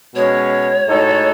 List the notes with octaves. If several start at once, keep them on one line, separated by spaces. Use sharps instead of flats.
B2 G#3 C#4 C#5
A2 G#3 D#4 F#4 A4